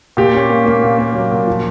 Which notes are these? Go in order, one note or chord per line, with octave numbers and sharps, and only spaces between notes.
A#2 G4
C#4
A#3
A#3
A#2
A#3
F#3
A#2
F3